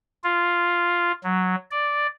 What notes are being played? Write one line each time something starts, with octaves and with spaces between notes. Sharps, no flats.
F4
F#3
D5